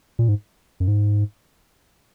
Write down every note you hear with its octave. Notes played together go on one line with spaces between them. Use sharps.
A#2
G#2
F#2
G#2